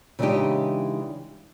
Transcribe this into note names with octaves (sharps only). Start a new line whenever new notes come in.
C#3 E3 G#3 D4 D#4 G4